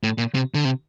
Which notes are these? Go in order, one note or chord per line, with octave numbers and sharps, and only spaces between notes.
A2
A#2
C3
D3
C3